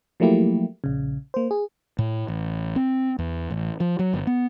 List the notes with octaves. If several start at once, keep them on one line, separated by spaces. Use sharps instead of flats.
F3 F#3 A3 A#3 E4 G4
A#1 C#3
A#3 C5
G#4
A2
A1
C4
E2
A1
F3
F#3
G1
B3